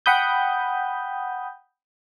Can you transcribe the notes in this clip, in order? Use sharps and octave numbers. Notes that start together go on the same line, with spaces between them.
F#5 G5 B5 D#6 G6